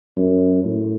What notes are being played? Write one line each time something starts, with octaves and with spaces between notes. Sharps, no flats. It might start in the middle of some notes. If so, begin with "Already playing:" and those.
F#2
A2